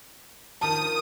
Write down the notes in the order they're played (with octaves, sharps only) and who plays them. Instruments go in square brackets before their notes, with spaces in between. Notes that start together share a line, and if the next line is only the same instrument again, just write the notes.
[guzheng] D#3 F3 [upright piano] A5 [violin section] D#6